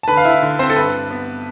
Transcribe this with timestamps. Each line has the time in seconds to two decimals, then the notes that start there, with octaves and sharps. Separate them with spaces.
0.03 A5
0.08 D3 B4 B5
0.17 F5
0.25 E4 E5
0.42 D3
0.59 C4 C5
0.70 A4
0.76 G2 B4
1.11 B3